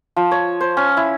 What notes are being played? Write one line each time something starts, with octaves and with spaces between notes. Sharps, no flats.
F3
C#5
C5
C#4
E4